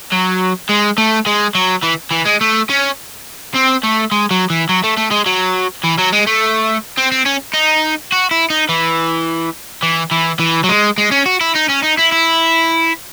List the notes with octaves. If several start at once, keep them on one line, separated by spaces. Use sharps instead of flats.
F#3
G#3
A3
G#3
F#3
E3
E3
G#3
A3
C#4
C4
A3
G#3
F#3
E3
F#3
A3
A3
G#3
F#3
E3
F#3
G#3
A3
C4
C4
C#4
D#4
F#4
E4
D#4
E3
E3
E3
E3
F#3
G#3
G#3
C#4
F#4
E4
D#4
C#4
D#4
E4
E4